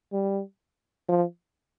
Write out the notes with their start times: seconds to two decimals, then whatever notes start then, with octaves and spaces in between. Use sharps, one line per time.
0.13 G3
1.09 F3